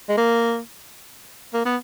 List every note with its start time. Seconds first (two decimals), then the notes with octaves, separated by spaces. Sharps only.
0.09 G#3
0.17 A#3
1.54 A#3
1.65 B3